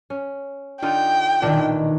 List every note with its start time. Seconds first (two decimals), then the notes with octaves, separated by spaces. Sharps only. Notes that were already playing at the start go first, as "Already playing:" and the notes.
0.10 C#4
0.82 D3 D#4 F4 G5
1.42 B1 A#2 D#3 E3 D4